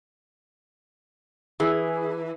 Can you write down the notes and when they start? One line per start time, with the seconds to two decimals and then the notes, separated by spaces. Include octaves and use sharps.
1.60 E3 G#4